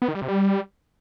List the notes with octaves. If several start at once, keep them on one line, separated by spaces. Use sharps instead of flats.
B3
D#3
G3
C3
G3